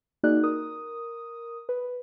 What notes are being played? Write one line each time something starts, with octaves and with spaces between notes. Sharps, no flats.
A#3 D#4 F#4 G#4 D5 F#6
A#4 D#6
B4